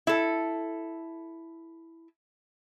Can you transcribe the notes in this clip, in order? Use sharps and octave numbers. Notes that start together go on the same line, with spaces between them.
E4 A4